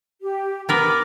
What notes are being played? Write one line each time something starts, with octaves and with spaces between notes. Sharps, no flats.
G4
B3 A#4 B4 D6